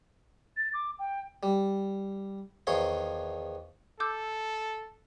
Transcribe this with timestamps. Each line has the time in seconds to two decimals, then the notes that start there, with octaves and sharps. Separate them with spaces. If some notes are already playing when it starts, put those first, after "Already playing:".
0.57 A6
0.74 D6
0.99 G5
1.43 G3
2.67 E2 D#3 F3 C#5 C6
4.00 A4 D6 E6 G6